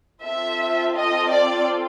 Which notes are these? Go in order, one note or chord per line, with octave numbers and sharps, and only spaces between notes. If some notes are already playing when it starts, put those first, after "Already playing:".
C4 F4 A4 E5
D#5
D5